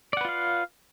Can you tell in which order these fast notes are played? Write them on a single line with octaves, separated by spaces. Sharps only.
D5 F#5 B4 F4 F5